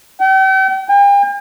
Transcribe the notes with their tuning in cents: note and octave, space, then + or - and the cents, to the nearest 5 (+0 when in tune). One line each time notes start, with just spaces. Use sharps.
G5 -40
G5 +45